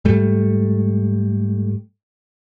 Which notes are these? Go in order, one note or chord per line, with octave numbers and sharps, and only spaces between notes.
G#2 G3 A3